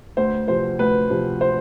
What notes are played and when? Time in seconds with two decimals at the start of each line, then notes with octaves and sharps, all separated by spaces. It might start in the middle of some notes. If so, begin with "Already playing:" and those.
0.17 D2 C5
0.47 C3 F3 C5
0.79 D2 B4
1.10 C3 F3
1.41 C5